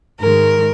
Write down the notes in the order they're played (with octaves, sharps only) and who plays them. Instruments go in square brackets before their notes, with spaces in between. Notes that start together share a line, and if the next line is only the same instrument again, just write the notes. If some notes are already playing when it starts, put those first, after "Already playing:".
[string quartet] G#2 D#3 G#3 A#4